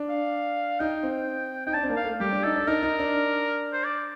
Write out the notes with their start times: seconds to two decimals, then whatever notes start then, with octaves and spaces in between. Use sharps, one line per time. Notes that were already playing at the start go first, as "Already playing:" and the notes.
Already playing: D4
0.09 F5
0.80 D#4 G5
1.03 C4
1.66 D#4 G5
1.74 D4 A5
1.83 C4
1.89 A#3
1.97 F5
2.04 A3
2.20 G3 G4
2.32 D4
2.44 D#4 A4
2.55 D4
2.67 D#4 A#4
2.83 D#4
2.99 D4
3.73 C5
3.84 D5